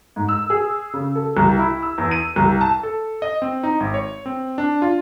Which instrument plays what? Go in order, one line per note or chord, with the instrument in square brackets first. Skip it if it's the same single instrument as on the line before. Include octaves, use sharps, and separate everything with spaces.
[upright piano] G#2
E6
G#4
C#3
A4
C2
E4
E6
E2
D#7
C2
A5
[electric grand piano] A4
D#5
C4
D#4
G#1
C#5
C4
D4
F4